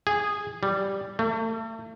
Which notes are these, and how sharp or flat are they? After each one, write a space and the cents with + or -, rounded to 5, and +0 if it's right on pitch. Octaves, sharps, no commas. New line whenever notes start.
G#4 -15
G3 +0
A3 +35